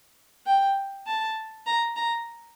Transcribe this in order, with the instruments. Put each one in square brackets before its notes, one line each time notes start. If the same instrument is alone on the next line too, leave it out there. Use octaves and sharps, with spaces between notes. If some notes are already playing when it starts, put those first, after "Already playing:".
[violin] G5
A5
A#5
A#5